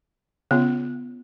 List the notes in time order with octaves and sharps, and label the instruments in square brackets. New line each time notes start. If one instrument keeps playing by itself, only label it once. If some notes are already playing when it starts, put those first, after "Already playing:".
[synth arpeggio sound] C#3 [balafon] B3 F4